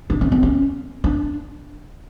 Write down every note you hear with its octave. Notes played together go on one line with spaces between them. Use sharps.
D4
C#4
C4
C#4
D4